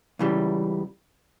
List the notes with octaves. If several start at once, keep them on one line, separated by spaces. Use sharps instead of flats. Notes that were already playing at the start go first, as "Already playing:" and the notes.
C#2 C#3 E3 G3